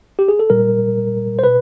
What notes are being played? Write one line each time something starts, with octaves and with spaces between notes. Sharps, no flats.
G4
G#4
A4
A#2 G3 A#4
C5
B2 B4